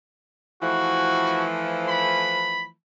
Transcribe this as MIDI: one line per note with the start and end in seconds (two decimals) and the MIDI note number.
0.63 2.72 52
0.63 2.72 53
0.63 2.72 57
0.63 1.45 66
1.89 2.64 83